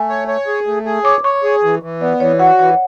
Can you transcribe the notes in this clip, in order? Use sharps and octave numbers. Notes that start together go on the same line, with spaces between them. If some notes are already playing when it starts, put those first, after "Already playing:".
Already playing: A3 G#5
C#5
C#5
G#4
A3
G#4
C#5 D6
C#5 C#6
G#4
E3
E3
B3 D5
E3 C#5
F#4 F#5
E3 F#5